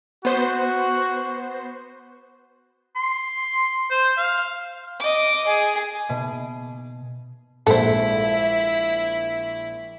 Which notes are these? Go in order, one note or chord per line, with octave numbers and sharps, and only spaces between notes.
B3 F#4 C5
C6
C5
F5
D#5 D6
G#4
B2
A#1 G#3 E4 A4 C5